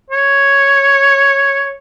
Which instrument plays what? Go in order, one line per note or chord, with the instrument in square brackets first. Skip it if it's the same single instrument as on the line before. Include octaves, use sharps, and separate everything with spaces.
[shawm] C#5